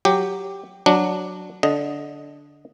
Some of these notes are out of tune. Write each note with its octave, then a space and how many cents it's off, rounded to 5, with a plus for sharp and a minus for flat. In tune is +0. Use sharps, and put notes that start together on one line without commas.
F#3 +0 G4 +0
F#3 -5 D4 +0
D3 -15 D#5 +5